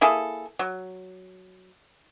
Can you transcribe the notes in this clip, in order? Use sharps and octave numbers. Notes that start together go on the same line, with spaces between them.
A#3 E4 G#4 A4
F#3